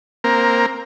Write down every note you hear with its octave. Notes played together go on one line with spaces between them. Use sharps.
A#3 C4 A#4